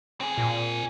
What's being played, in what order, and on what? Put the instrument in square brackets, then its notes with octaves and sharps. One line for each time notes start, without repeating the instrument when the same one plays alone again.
[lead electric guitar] C4 G#4
[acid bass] A#2